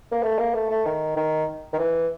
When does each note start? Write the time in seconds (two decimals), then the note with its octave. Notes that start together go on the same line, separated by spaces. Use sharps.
0.12 A#3
0.23 A3
0.39 A#3
0.54 A3
0.70 A3
0.85 D#3
1.17 D#3
1.73 D#3
1.79 E3